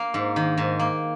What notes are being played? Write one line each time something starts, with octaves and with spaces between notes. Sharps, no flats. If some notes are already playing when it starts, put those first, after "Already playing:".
Already playing: A#3 F5
G#2
D#3
G#2
A#3